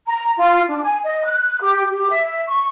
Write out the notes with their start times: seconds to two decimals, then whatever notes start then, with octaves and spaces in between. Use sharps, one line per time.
0.07 A#5
0.37 F4
0.68 D4
0.83 G#5
1.03 D#5
1.23 F#6
1.60 G4
1.89 G4
2.09 E5
2.47 C#6